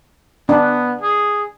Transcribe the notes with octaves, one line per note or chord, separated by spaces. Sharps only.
B3 D4
G#4